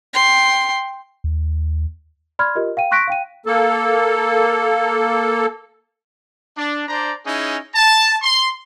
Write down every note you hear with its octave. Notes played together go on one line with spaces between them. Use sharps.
G5 C6
D#2
D5 B5 C6 F6 G#6
F4 G4 A#4 D#5
F5 G5 D#7
C6 C#6 F#6 A#6 B6 D7
F5 G5 D#7
A#3 A4
D4
D4 C5 D5 A#5
C#4 D#4 E4 G#4
A5
C6